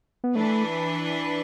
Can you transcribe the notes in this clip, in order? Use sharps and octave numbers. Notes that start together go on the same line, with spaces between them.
B3
E3 A3 D4 B4